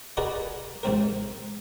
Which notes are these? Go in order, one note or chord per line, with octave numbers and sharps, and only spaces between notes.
F#4 G#4 A#4 B4 D5 D#5
A1 G#2 C4 A#4